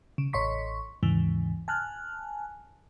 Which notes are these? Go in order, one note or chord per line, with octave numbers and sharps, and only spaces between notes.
C#3
A1 C#5 D#5 C6 C#6 B6
D#2 G#2 C#3 E3
G#5 A5 F6 F#6